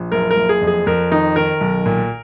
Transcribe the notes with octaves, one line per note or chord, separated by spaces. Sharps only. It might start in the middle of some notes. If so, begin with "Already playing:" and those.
Already playing: A#1
F#1 A#4
A#4
F#1
G#4
F2
G#4
F2 A#4
D#3 D#4
D#3 A#4
B1
A#2